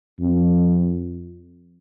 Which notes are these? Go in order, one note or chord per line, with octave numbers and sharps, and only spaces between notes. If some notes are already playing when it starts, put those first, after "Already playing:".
F2